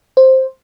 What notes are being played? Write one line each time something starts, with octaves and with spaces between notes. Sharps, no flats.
C5